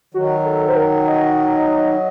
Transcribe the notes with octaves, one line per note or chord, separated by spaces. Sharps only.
D#3 F#3 F#4
A4
C5
A#4
D#5